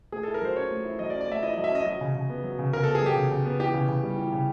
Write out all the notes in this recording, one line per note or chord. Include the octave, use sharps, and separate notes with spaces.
A3 G#4
E4 A4
A#4
F#3 C5
C#4 C#5
A3
E4
F#3 D#5
D5
C#4
D5
A3 E5
E4 D#5
F#3 D#5
E5
C#4 D#5
F#3 D#5
C#3
C#3
B3
F#3
C#3
C#3 A#4
B3 A4
G#4
F#3 G4
C#3
C#3
B3
E3 G4
C#3
C#3
G3
E3
C#3